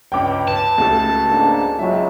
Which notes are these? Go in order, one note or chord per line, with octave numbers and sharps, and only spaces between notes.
C#2 G2 C#4 G5 D6
B4 A5
C#2 A3 F#4 A4
G#2 A#3 D4
C#2 F#3 E5